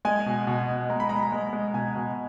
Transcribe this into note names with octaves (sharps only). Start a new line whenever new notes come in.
G#3 G#5
B2
B2
B2
G#3 A#5
B5
G#3 A#5
G#3
G#3
B2 G#5
B2